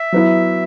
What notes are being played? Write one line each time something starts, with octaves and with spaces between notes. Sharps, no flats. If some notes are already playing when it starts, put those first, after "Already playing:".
Already playing: E5
F#3 B3 E4